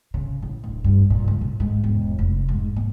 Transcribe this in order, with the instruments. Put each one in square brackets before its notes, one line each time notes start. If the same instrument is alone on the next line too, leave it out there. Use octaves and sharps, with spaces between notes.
[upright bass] C#3
A1
D1
G2
A#2
C#2
A1
G#2
E1
F1
G#2
A#3